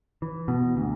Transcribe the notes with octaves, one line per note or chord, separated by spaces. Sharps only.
E3
B2
D2